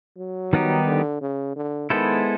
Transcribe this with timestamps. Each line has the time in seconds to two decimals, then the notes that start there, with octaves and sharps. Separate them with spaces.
0.18 F#3
0.53 D#3 G3 B3 D#4 G4
0.87 D3
1.21 C#3
1.56 D3
1.90 D#3 G#3 B3 E4 A4 C5